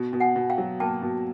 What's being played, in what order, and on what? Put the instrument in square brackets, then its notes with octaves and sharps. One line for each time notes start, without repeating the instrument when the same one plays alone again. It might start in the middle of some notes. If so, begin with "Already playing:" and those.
Already playing: [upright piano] B2
B2
[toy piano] F#5 G#5
[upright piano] B2
[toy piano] F5 G5
[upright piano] F#3
[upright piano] A#3 [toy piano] G5 A5
[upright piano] B2